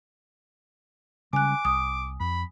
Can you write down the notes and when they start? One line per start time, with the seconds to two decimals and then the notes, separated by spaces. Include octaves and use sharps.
1.33 C#3 G3 G#3 G#5 D6 F#6
1.65 C2 D#6
2.20 F2 B5